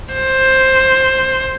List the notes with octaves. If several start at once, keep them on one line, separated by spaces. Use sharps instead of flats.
C5